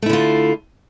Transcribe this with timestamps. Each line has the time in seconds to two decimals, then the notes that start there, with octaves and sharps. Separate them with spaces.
0.02 A3
0.06 E4
0.09 D3
0.13 F4